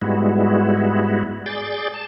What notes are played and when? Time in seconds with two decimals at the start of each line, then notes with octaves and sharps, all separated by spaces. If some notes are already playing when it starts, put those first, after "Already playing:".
0.02 G#2 G3 G#3 B3 E4 F#4
1.46 G#4 D5 G6 A6
1.94 A5